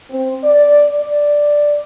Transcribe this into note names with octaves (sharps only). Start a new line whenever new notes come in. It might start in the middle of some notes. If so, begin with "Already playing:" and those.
C4
D5
D5